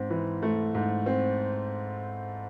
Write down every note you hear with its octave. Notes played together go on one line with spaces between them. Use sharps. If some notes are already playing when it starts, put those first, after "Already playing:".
Already playing: G#2 C4
E3
A3
G#2
C4